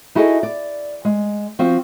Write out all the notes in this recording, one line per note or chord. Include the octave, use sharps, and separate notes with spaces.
D#4 E4 F#4 G#4 A4 D#5
D5
G#3
F3 C4 F#4